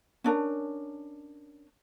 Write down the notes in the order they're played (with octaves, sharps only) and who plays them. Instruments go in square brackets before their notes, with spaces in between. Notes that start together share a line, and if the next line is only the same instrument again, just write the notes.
[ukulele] C#4 D4 A#4